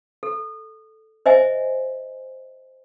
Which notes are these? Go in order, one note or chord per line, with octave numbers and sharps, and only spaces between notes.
A4
C5 D#5 E5 G#5